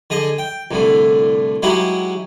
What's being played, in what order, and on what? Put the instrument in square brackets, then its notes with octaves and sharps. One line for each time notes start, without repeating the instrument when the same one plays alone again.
[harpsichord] D3 G#4 D#5
G5
C2 A2 D3
F#3 G#3 D#4 E4 F#4 G4